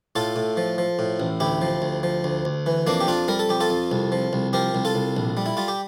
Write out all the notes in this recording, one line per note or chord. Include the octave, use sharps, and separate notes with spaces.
A2 F4 A4
A2
F3
F3
A2
A1
D2 E4 G4
F3
D2
F3
D2
D2
E3
F2 A#3 D4
G4
F2 D4 F4
G3 A#4
A4
F2 G4
F4 A4
F2
C2
F3
C2
F3 G4 A#4
C2
F4 A4
C2
A#1
G3
E4
G3 F4
G4